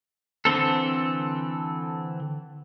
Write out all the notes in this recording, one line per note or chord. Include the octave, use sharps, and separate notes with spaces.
D3 E3 C4 A4